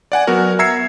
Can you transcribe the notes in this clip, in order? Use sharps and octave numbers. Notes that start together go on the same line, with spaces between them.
D5 F#5 G#5
F#3 B3 F#4 A#4
E5 A#5 E6 G#6 C7 C#7